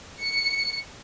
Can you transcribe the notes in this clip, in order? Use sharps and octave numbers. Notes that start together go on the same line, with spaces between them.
C#7